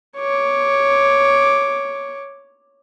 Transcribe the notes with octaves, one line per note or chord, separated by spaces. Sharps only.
C#5 D6